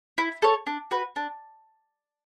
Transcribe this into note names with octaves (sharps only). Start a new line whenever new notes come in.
E4
A4 C#5
D4
F#4 B4
D4